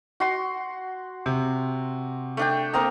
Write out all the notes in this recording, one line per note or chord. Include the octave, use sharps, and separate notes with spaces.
F#4 C6
C3
A3 D4 G5
A#3 C4 A#5 D#6